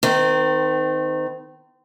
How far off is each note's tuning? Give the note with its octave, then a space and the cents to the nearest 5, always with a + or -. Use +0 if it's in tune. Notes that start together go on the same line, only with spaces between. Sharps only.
D#3 +0 C4 -35